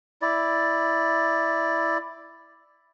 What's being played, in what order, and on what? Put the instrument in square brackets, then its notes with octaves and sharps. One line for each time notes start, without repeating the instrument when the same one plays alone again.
[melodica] E4 D5